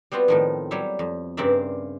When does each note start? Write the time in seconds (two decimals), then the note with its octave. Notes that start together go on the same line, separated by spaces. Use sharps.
0.12 G3 B3 C4 F4 F#4
0.28 A2 D#3 F3
0.71 F#3 G3 C#5 E5
0.99 F2
1.37 G2 C#3 C4 A#4 D5 E5